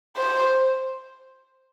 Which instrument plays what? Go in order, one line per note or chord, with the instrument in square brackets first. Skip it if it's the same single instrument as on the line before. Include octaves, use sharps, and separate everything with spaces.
[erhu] C5